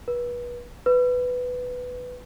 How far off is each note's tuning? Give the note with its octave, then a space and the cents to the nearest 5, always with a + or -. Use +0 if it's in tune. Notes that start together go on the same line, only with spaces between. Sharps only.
B4 -30
B4 +10